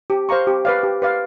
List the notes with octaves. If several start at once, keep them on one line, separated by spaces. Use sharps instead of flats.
G4
C5 F5 A#5 C#6
G4
B4 D5 F5
G4
B4 D5 F5